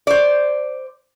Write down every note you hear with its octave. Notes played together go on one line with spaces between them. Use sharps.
C5 D5